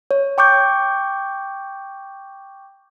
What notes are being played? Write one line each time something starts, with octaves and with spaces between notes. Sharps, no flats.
C#5
G5 C#6 D6 G6